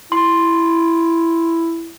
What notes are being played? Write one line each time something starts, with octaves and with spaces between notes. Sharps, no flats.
E4 C6